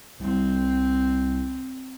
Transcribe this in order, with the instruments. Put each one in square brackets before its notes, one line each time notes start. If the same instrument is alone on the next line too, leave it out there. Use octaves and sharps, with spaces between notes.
[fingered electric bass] C2 G3 [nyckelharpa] C4